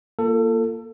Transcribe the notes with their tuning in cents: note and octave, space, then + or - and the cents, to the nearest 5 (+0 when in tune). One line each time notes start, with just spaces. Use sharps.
A#3 +0 F4 -20 A4 +25